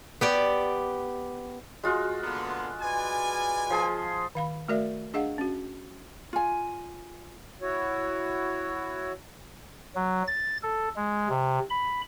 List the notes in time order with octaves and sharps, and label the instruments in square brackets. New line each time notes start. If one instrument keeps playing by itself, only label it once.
[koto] B3 G4 D5
[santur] G#3 F4 F#4
[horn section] D3 A#3 B3
B4 D5 G#5
[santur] F3 G#4 C6
[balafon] D#3 F5 B5
A3 F#4 A#4 D5 E5
D4 G#4 D#5 F5 F#5
C#4 F#4
[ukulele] F4 G#5
[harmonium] E4 F#4 C#5
[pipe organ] F#3
A6
A4
G#3
C3
B5